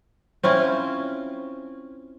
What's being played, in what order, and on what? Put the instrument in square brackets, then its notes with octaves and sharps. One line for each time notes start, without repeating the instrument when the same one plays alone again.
[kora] C4 C#4 E4 F4